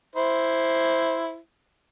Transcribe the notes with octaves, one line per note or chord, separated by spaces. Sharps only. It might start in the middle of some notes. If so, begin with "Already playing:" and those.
E4 C5